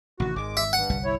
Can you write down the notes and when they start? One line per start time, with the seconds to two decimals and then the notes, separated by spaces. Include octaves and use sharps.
0.20 A1 C3 D#3 F#4
0.36 G#1 D#3 G#3 D6
0.57 E5
0.73 G2 F#5
0.90 G1 C2 G3
1.04 E4 C#5